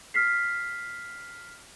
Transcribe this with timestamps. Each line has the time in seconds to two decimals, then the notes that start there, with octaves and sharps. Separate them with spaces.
0.14 F6 B6 C7